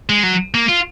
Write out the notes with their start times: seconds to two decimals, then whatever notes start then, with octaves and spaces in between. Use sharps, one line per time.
0.10 G#3
0.23 F#3
0.54 A#3
0.68 F4